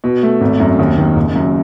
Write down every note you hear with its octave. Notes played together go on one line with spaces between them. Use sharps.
B2
A3
G#1
F#2
D#2
D#3
F#1
F#2